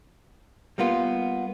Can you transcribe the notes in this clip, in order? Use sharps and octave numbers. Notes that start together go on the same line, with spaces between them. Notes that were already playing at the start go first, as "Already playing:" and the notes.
G3 A#3 B3 F4